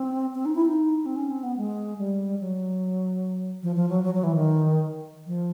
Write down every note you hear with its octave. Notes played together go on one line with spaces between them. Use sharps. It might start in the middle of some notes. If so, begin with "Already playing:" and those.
Already playing: C4
C4
D#4
E4
D#4
C4
C#4
C4
B3
G#3
G3
F#3
F3
F3
F#3
F#3
F#3
E3
D#3
F3